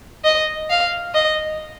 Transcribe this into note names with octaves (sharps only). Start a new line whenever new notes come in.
D#5
F5
D#5